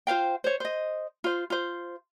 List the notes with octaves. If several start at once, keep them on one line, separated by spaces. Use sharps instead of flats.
F4 C5 F5 G5
C5 C#5
C5 D#5
F4 C5
F4 C5